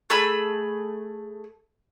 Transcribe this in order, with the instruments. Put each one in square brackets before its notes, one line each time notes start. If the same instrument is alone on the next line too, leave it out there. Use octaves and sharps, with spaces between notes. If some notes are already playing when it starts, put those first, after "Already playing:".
[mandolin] A3 G#4 B5 E6